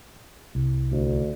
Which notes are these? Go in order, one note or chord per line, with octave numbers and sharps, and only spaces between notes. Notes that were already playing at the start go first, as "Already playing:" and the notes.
C2
D2